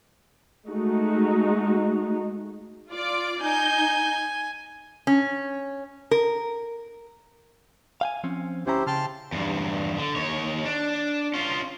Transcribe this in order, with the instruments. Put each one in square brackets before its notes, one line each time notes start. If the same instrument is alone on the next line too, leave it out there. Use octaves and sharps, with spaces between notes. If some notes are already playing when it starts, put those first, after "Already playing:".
[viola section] G#3 A3 D#4 F#4
[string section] F4 D5 D6
[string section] D#4 G6 [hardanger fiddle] G#5
[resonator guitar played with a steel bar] C#4
A#4
[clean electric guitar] F5 G5 G#5
F3 C4 C#4
[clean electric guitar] D2 C#4 A#5 [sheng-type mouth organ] E4 G4 C5
[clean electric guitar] C#3 G5 [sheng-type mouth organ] A5 C6 F6
[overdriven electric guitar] E2 G2
D3
D#2 C#5
D4
C#4 F4